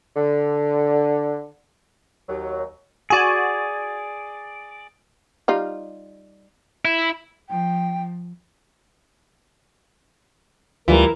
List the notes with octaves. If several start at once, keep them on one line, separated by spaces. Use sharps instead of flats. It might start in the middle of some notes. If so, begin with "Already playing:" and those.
D3
D#2 F#3
F#4 G#4 D5 G#5
G3 D#4 F4
E4
F3 G5
D2 E3 G3 F4 A#4